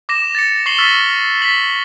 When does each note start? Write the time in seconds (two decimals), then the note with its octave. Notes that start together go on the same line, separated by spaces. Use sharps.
0.09 D6 A#6 E7
0.35 A6 A#6 C#7
0.66 C#6 A#6 C7 F#7 G7
0.78 C#6 E6 F6 A6 B6
1.42 A6 B6 F#7